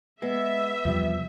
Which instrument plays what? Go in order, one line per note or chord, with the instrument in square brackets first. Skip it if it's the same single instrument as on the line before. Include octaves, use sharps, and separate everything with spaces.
[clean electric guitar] G#3 [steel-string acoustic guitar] B3 [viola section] E5
[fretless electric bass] E2 C3 G3 [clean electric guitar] F3